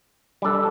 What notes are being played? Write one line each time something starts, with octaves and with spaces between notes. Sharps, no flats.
G3 D4 A4